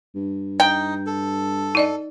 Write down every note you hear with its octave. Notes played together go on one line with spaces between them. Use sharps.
G2
D#4 G5
A4
D#4 D5 D#5